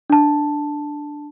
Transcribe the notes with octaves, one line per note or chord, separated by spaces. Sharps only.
D4 A5